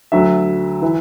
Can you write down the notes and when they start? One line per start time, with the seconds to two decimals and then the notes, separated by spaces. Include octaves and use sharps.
0.12 D2 D3 F#3 E5
0.82 E3